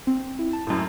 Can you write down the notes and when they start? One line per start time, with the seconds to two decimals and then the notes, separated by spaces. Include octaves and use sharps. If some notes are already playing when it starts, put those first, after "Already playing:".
0.07 C4
0.39 E4
0.53 A5
0.67 F#2 A2